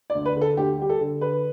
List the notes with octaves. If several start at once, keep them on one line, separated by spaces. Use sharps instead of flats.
D5
D2
B4
D3
A4
D2 G4
G3 G4
A4
D3
D3 B4